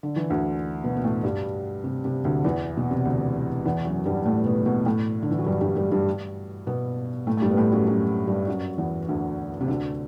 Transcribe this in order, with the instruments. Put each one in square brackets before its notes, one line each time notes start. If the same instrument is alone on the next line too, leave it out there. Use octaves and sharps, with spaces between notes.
[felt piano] D3
E3
D2 D3
B2 B3
B3
A2 A3
G2 G3
C3
C3
D2 D3
E2 E3
B2
C3
D2 D3
E2 E3
F#2 F#3
G2 G3
A2 A3
B2 B3
B2 B3
A2 A3
D3
E3
F#3
G2 G3
G2 G3
G2 G3
G2 G3
B2 B3
A2 A3
A3
G2 G3
B3
A2 A3
F#2 F#3
F#2 F#3
G2 G3
F#2 F#3
E2 E3
D2 D3
C3
D2 D3